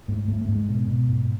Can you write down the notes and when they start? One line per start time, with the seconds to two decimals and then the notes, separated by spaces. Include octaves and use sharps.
0.08 G#2 A3
0.28 G#2 A3
0.41 A3
0.49 G#2
0.55 G#3
0.69 B2
0.88 B2
1.09 G#2